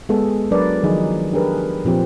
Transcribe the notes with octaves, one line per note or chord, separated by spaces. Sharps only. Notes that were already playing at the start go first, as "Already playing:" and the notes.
G#3 B3 G#4 A4
F#3 D4 A#4 B4 D5
D#3 F3 F#3 D#4 G#4
D4 G4 G#4 A#4 B4
A#2 F3 C4 G4